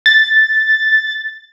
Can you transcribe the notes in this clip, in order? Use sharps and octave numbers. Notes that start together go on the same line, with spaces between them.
A6